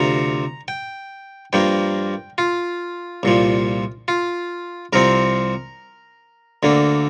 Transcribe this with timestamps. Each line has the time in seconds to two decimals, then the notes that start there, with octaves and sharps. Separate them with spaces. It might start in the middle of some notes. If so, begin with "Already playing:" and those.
Already playing: D2 C3 F3 A#5
0.68 G5
1.53 G2 F3 A#3 G5
2.38 F4
3.23 C2 A#2 F3
4.08 F4
4.93 C2 C3 F3 C4 A#4
6.63 D2 D3 A#3